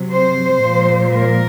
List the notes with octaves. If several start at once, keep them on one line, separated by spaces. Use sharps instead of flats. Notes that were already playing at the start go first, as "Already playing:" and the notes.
Already playing: C3 F#3
C5
A#2 F3 G#3
A#4